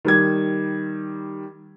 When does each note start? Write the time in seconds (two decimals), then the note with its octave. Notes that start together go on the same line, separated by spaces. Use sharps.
0.05 D#3 G3 G#6